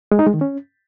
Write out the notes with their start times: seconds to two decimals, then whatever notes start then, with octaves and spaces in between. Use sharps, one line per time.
0.12 G#3
0.19 D#4
0.26 G#3
0.34 D#3
0.41 C#4